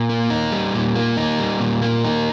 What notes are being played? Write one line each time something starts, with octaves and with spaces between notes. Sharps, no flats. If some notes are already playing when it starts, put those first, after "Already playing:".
Already playing: A#2
A#3
D#4
G3
A#2
A#3
D#4
G3
A#2
A#3
D#4